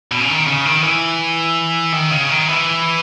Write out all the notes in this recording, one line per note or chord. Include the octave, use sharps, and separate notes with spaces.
B2
C#3
D#3
C#3
D#3
E3
D#3
C#3
D#3
E3